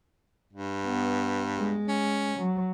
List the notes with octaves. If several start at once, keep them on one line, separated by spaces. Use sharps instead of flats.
G2
B3
G#3
C#4
F#3